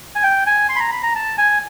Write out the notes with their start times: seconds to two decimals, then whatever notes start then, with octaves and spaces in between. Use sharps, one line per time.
0.15 G#5
0.23 G5
0.46 G#5
0.69 C6
0.76 B5
0.80 A#5
0.92 B5
1.03 A#5
1.15 A5
1.38 G#5